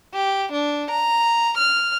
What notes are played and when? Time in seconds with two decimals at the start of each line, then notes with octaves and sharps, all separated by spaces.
0.14 G4
0.53 D4
0.91 A#5
1.58 F6